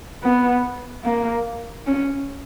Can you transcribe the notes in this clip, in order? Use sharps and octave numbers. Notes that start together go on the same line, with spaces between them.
B3
A#3
C#4